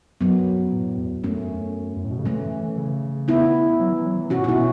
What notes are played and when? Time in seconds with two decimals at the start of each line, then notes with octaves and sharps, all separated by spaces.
0.21 F#2 F#3 B3
0.73 A2
0.98 E2
1.23 F#2 A3 C#4
1.97 F#2
2.04 A2
2.11 B2
2.19 C#3
2.25 E3 A3 C#4
2.69 E3
2.78 C#3
3.28 B3 E4
3.80 F#3
3.92 E3
4.06 F#3
4.19 E3
4.30 B2 C#4 F#4
4.38 A2
4.44 B2 B3 E4 F#4